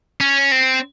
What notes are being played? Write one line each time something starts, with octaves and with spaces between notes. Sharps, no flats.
C#4
C4